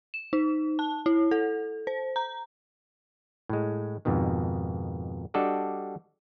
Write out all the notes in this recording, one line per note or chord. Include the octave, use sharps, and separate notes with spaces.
E7
D#4
A5
E4
A4
C5
A#5
A2 G#3
F2 G#2 B2 D#3
G3 D4 F#4 A4 D5 D#5